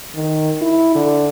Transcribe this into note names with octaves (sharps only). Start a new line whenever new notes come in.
D#3
E4
D3